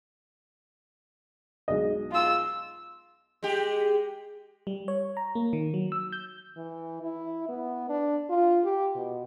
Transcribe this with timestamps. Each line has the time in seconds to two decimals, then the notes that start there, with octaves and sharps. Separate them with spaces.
1.68 B1 G#3 D#5
2.11 F4 E6
3.43 G#3 G4
4.67 G3
4.88 C#5
5.17 A#5
5.35 A#3
5.53 D#3
5.74 F#3
5.92 E6
6.12 G6
6.57 E3
7.02 E4
7.49 B3
7.89 D4
8.30 F4
8.64 G4
8.95 B2